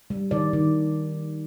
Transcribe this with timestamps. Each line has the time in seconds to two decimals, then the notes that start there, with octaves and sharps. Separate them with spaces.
0.10 G3
0.31 D#3 D5
0.53 D#3